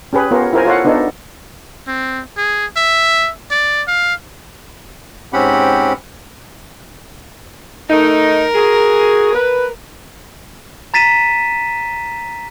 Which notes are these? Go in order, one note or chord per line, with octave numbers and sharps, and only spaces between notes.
C#4 G4 G#4 B4
B3 F4 G4 A#4 C#5
E4 F4 A#4 C5 G#5
F4 A4 C#5 F5 F#5
B3 D4 D#4 A4
C4
G#4
E5
D5
F5
G#2 C4 C#4 G4 F#5 B5
A3 D#4 A#4
F#4 G#4
B4
A#5 A6 B6 D#7 E7